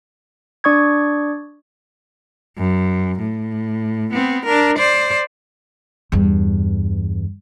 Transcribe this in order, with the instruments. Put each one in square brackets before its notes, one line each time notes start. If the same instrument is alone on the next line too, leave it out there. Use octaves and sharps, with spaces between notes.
[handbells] D4 D5 C#6 D#6 G#6
[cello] F#2
A2
B3 C4
D4 A#4
C5 D5
[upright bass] E2 G2